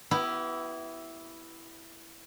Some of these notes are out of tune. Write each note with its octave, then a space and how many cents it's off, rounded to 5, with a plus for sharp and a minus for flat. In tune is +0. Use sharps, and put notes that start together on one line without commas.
B3 +0 E4 +0 G4 -40